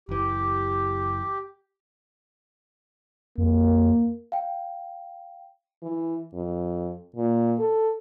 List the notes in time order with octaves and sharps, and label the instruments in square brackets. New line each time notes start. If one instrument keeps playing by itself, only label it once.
[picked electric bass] F#1 E3 [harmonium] G4
[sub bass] F2 [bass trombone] A#3
[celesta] F5 G5
[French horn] E3
F2
A#2
A4